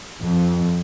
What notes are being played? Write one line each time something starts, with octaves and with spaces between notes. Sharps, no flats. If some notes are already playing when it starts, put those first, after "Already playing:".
F2